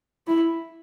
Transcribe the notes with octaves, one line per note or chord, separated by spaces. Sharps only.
E4